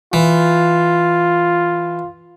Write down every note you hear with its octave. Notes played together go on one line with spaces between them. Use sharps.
E3 F4